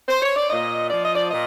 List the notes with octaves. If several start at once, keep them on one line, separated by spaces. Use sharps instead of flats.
C5
C#5
D5
A#2 D#5
F3 D5
D#5
D5
A#2 D#5